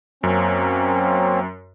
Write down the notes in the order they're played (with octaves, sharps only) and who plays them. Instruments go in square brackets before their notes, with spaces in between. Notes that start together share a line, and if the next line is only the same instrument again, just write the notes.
[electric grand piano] F#2 [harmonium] A#3 C4 C#4